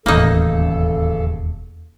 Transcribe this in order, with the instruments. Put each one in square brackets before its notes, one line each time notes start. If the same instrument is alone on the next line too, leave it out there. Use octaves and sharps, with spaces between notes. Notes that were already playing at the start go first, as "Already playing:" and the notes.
[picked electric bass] E1 D#2 [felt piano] A1 [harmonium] C#3 A4 [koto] A#3 D#4